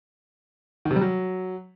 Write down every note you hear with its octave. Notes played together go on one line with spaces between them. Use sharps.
D#3
C3
G3
F#3